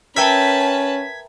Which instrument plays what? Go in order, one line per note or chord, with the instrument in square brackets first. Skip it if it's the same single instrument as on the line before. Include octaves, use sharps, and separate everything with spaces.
[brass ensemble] C#4 [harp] A#4 E5 G5 [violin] B4 A5 [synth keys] G#6 B6